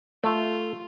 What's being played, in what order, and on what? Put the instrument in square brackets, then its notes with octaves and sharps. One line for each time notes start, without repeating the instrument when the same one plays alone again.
[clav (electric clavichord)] A3 [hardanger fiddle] F4